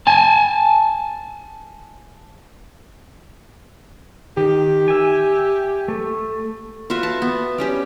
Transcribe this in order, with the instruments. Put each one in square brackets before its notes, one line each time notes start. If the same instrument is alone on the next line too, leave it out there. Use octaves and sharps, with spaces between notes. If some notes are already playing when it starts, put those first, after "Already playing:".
[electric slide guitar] G#5 A5
[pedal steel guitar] D#3 [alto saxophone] G4
[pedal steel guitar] E5 G#5
A3
[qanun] F4 F#4 B4 E5
A5
B3
G3 C#4 G4